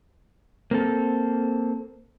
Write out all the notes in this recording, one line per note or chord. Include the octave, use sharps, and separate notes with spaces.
A#3 C4 A4